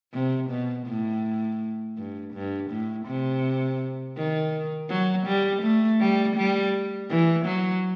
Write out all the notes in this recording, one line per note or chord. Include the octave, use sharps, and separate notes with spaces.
C3
B2
A2
G2
G2
A2
C3
D#3
F#3
G3
A3
G3
G3
E3
F#3